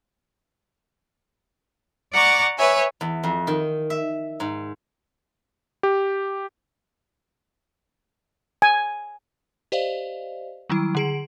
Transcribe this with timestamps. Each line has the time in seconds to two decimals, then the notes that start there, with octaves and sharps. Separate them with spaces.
2.12 D5 F#5 A#5 C#6 D6
2.58 B4 C#5 E5 G#5
3.01 E2
3.24 F2
3.47 D#3
3.90 E5
4.40 G#2
5.83 G4
8.62 G#5
9.72 G4 C5 D5 D#5 F5
10.70 D#3 F#3 G3 E4
10.95 D3 G#4 D7